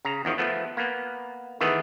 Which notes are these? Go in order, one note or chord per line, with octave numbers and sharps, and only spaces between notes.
C#3 A#5
E2 D#3 F3
F3 A3 B3
A#3 B3
D#3 E3 A3 B3 G#4